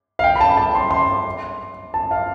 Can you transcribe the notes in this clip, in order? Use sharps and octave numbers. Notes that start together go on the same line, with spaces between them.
F5
G5
B5
A5
A5
C6
C6
A5
F5